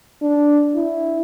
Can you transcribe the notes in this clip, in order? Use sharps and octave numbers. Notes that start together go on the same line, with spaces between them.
D4
E4